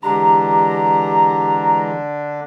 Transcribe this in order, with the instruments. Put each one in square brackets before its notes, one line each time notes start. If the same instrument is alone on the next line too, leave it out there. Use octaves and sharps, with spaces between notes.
[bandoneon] D3 D4 [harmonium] E3 G#3 [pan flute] G4 [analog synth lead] A#5